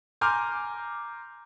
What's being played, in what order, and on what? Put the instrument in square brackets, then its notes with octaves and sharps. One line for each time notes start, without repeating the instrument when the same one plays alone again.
[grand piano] G#5 A#5 C6 D6 F6 G6